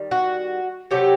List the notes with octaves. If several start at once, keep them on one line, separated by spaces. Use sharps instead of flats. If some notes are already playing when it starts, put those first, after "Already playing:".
Already playing: D#3 G3
F#4
C3 F#3 A3 G4